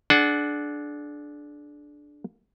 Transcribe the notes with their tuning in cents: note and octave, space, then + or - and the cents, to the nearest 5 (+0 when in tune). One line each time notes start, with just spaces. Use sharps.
D4 +0 G#4 +45 F#5 +5